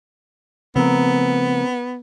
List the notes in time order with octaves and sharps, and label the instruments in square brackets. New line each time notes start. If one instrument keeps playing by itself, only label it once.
[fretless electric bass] C#3 F3 A3 [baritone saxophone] B3 [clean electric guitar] C4 A#4